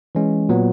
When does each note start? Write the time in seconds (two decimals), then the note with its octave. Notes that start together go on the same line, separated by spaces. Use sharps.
0.15 E3 G#3 C#4
0.49 A#2 F#3 B3